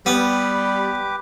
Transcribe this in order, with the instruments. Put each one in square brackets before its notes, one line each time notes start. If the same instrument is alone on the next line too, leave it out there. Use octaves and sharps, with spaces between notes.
[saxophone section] G3 [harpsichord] B3 [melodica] G4 B4 D6